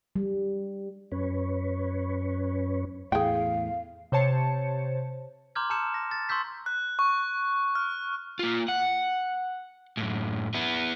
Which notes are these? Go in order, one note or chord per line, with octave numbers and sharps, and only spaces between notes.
G3
F#2 C#4 B4 C#5
E2 A2 G#4 F5 G5
C3 C5 C#5 A5 C#7
A#5 C6 D6 F6 G6 G#6
A5 A#5 E6 G6 C#7 E7
A#6
A6
C6 C#6 E6 G6 B6
F#6
C#6
F6
A#3 F4
F#5
F#2 A2
B3 E4